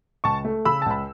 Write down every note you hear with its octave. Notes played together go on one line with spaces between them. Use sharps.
C#2 A5 C#6
A3
C#3 B5 E6
A5
C#2 B5